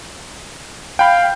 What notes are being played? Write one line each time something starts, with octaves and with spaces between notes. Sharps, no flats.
F5 G5 B5 G6